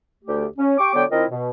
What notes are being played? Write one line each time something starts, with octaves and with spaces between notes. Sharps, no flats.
D2 A3 G4
C#4
G4 G5 C#6 D6
D3 F#3 B3 C#5 G5 D6
D#3 C4 E4 F4 A#4 D#5
B2